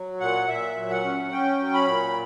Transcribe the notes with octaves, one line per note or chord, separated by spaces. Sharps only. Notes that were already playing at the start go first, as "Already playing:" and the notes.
Already playing: F#3
A#2 F#5
A#2 E5
F#3
F#5
C#4
C#4 G5
F#3
B5
A#2